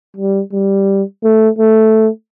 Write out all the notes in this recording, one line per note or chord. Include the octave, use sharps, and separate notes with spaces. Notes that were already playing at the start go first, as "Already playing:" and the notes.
G3
G3
A3
A3